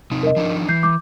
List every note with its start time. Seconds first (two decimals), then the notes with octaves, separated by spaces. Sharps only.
0.11 C3 C4 D#4
0.23 A#4 D#5
0.36 F3 D4 D#4
0.69 E3 G6 C7
0.83 D6 G6